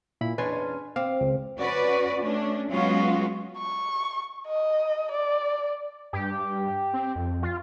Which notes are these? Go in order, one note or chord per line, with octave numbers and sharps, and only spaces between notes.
A#2 E4 B5
E2 C#4 D4 B4 G#5 C6
C4 F5 D6
C#2
C#4 F#4 B4 D5
A3 C#4 D4
F#3 G#3 B3 C#4 F4 F#4
C#6
D#5
D5
G2 G4
C4
F2
F4